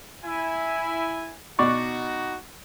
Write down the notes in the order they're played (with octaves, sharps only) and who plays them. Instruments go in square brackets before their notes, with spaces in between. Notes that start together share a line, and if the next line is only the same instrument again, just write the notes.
[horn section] E4 G#5
[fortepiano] B2 D5 C#6 [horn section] D#4 F#4